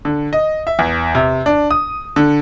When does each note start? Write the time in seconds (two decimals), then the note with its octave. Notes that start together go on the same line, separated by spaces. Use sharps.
0.05 D3
0.33 D#5
0.67 E5
0.79 E2
1.15 C3
1.46 D4
1.71 D#6
2.16 D3